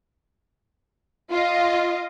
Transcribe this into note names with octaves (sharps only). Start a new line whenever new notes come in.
F4 D#5